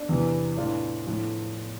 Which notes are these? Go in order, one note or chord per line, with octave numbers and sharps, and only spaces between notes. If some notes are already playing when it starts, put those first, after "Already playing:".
Already playing: D4
E2 C3 E3
A2 E3 D4 F4
A2 F3